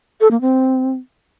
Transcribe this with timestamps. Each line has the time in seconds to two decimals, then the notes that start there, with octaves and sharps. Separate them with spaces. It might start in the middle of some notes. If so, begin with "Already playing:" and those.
0.21 A4
0.31 A#3
0.41 C4